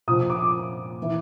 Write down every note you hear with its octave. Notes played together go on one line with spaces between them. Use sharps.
A#2 F3 D#6
D6
E3